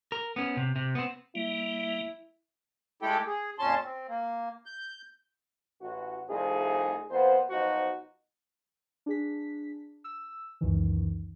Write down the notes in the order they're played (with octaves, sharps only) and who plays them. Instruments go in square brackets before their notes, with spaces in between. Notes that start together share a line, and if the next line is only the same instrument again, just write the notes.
[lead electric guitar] A#4
B3 C#4
C3
C3
B3 C4
[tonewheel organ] G3 A#3 [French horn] E4
[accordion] G#3 A3 E4 G4 A4 G5
G#4
F2 A#2 C#4 A5 C6
C4
A#3
G6
[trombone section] A1 F#4
C2 F3 A3 C4 D#4 G#4
F2 A#3 B3 C5
B1 F3 D#4 F#4 C5
[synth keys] D4 G#4 B6
E6
C#2 F#2 D#3 E3